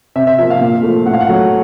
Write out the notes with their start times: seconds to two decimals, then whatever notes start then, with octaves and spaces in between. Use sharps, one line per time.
0.16 C3 E5
0.27 E5
0.38 F3 A#3 E5
0.50 F5
0.61 A#2
0.83 F3 A3
1.06 A2 F#5
1.13 F5
1.21 F#5
1.29 F#3 A3